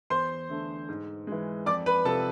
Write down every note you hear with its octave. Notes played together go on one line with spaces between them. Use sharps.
E2 C5 C6
D3 A3
G#2
E3 G#3
F2 D5 D6
B4 B5
C3 F3 A4 A5